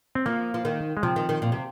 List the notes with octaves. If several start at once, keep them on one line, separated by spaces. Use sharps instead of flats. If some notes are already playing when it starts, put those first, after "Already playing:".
C4
F3 A#3
F3
D#3
G#3
C3 F3
D#3
D#3
A#2
C3